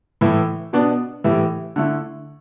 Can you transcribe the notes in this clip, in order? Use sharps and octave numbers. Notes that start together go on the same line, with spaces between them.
A2 E3 A3 E4
B2 B3 D4
A2 E3 G3 E4
D3 A3 E4